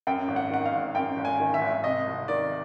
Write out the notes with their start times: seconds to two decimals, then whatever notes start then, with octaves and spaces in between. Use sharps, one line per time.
0.07 F#2 G5
0.28 G#1
0.36 F#5
0.50 D#3 F#5
0.65 F5
0.73 G#1
0.95 F#2 G5
1.17 G#1
1.25 G#5
1.40 D#3
1.54 E5
1.61 G#1
1.84 C3 D#5
2.07 C2
2.28 D#3 D5